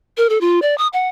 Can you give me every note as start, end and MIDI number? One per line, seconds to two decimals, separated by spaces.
0.17 0.29 70
0.29 0.40 69
0.41 0.60 65
0.62 0.77 74
0.78 0.87 87
0.93 1.09 78